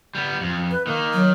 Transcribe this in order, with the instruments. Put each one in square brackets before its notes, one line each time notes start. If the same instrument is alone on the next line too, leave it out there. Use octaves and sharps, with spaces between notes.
[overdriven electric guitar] G3 B3
F2
[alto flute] B4
[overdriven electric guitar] D#3 [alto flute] A#3
[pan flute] F#3